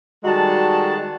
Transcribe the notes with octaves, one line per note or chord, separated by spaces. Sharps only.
D#3 G3 G#3 F#4 A4 A5